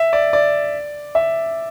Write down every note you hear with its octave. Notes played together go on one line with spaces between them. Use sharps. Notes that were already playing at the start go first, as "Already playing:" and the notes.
Already playing: E5
D5
D5
E5